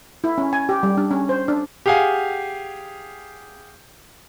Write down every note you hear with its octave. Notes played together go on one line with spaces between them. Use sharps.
E4
C#4
G#5
G4
G3
D4
C#4
C5
D4
G4 G#4 F5 F#5 G#5